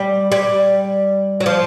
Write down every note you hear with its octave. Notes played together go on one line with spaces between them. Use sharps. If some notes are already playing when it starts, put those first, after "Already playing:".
Already playing: G3
G3
F#3
F3